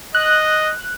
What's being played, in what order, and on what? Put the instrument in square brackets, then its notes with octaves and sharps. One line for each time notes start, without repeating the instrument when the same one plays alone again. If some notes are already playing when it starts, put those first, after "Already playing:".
[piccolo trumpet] D#5 [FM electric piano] F#6